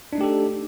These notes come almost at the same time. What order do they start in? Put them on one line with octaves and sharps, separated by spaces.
D4 D#4 A3 G4 A4